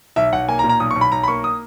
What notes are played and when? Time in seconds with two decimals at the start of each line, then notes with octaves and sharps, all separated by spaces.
0.16 B1 E5
0.32 B1 F#5
0.48 A#3 G#5
0.59 A#5
0.64 A#2
0.69 A#5
0.80 B1 D#6
0.91 C#6
0.96 B1
1.01 B5
1.12 B1 A#5
1.24 B5
1.28 A#3 C#6
1.44 D#6